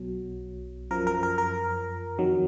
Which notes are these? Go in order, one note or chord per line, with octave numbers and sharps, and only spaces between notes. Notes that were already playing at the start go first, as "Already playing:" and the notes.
Already playing: B1 B2 F#3
F#2 F3 A#4
A#4
A#4
A#4
F2 D#3 F#3